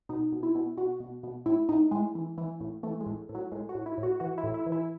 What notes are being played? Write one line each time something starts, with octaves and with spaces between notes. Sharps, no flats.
B2 D#4
B2
E4
B2
B2 F#4
B2
B2
A2 E4
A2 D#4
A2 G#3
E3
E3
A2
E3 A3
G#3
A2
A2
F#3
A2 G#3
F#4
A2
E4
A2
F#4
E3 F#4
E4
A2
E4
E3
E4